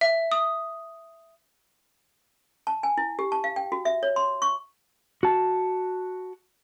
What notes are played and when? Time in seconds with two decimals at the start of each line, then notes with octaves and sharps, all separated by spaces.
0.01 E5
0.32 D#6
2.67 A5
2.83 G#5
2.98 E4
3.19 G4
3.32 A5
3.44 F5
3.56 G5
3.72 F#4
3.85 E5
4.03 C#5
4.16 C6
4.42 C#6
5.23 F#4 A5